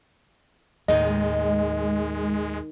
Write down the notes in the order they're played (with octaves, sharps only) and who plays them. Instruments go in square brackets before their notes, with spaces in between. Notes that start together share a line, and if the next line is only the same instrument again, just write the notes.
[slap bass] D#2 A2 [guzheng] D#3 D#4 [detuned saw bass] G#3 [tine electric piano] D#5